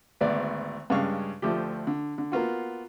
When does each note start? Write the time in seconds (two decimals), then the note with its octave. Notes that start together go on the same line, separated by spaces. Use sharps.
0.21 G#1 D2 B3 D5
0.90 G2 C#3 G#3 F5 C#6
1.42 D2 F3 A3 G4
1.87 D3
2.18 D3
2.32 A#3 B3 F4 F#4